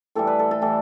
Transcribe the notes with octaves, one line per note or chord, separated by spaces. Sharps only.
A2 E3 G3 A4
B4
A4
A4
A2 E3 G3 A4